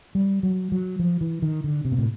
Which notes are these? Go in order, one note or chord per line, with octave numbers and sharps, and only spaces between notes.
G3
F#3
F#3
F3
E3
D#3
D3
C3
A#2
A2